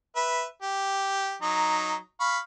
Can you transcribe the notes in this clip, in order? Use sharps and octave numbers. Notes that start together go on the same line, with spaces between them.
B4 E5
G4
F#3 D#4 A#5
F5 B5 C#6